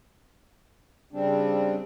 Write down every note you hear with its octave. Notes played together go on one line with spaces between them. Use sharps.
C#3 G3 C4 D4